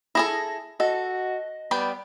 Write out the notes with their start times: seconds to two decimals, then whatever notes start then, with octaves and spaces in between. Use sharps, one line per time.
0.15 E4 G#4 A4 A#6
0.80 F#4 A4 D#5
1.71 G3 B3 D5 G5